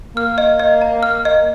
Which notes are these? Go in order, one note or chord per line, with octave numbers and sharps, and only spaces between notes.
A#3 F6
D#5
D#5
A#5
F6
D#5